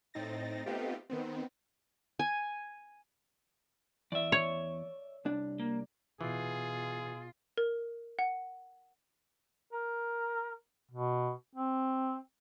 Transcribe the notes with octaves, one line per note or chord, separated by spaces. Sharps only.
A2 C4 D#4 A6 A#6
A3 B3 C4 D#4 F4 G4
D#3 B3 C4
G#5
E2 D5 E5
C#5
C2 D4
A#3
B2 E3 F4 G#4
A#4
F#5
A#4
B2
C4